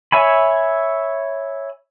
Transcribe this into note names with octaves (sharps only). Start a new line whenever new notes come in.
C#5 E5 G#5 B5